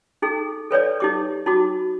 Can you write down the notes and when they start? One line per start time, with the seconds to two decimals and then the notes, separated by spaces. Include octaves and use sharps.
0.22 D#4 G#4 A4
0.71 A4 B4 C#5 D5
1.00 D#4 G4 D6
1.46 D#4 F#4 D6